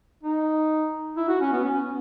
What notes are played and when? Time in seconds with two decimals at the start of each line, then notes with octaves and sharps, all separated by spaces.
0.23 D#4
1.16 E4
1.28 F#4
1.41 C#4
1.52 B3
1.64 C#4